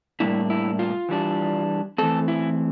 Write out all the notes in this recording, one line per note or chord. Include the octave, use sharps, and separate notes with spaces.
A2 G3 A#3 D4 E4
E4
F4
E3 G3 D4
E3 A3 C4 A4
E4